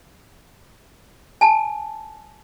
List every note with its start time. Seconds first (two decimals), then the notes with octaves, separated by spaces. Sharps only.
1.41 G#5 A5